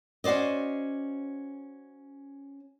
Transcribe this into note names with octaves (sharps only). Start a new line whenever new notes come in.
C#4 F#4 C5 D5 D#5